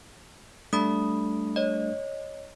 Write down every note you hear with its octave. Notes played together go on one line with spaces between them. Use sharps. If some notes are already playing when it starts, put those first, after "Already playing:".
G3 A3 D4 B5 D#6
C#5 D#5